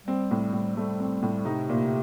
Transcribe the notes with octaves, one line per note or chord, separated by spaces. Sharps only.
G3 C4
A2
A2
G3 A3
C4
A2
C3 D#4
A#2